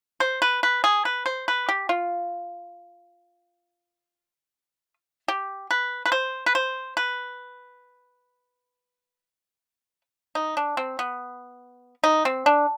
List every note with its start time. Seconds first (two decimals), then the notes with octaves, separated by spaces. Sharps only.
0.20 C5
0.42 B4
0.63 B4
0.84 G#4
1.05 B4
1.26 C5
1.48 B4
1.69 G4
1.89 F4
5.28 G4
5.71 B4
6.06 B4
6.12 C5
6.46 B4
6.55 C5
6.97 B4
10.35 D#4
10.57 D4
10.77 C4
10.99 B3
12.04 D#4
12.25 C4
12.46 D4